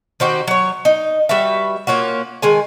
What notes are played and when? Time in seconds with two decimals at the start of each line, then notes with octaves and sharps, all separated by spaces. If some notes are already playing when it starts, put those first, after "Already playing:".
0.20 D#3 C4 F#4 G4
0.47 F#3 C#5
0.85 D#4
1.29 G3 F#4 B4 E5
1.87 A#3 C#4 F4 F#4
2.42 D#3 G#3 G#5